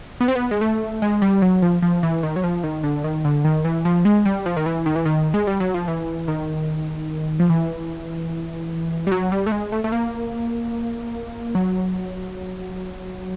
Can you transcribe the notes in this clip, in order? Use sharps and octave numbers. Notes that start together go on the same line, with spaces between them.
B3
C4
B3
G#3
A3
G#3
G3
F#3
F3
F3
E3
D#3
F#3
F3
D#3
D3
D#3
D3
D#3
E3
F3
G#3
G3
F3
D#3
E3
D#3
E3
D#3
G#3
G3
F#3
F3
E3
D#3
F3
E3
G3
F#3
G3
A3
G#3
A3
A3
A#3
F#3